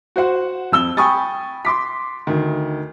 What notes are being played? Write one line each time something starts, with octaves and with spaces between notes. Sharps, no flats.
F#4 C5 F#5
F2 E6 G7
G5 G#5 B5 C#6 D#6 A6
C6 D6 B6
D2 D#3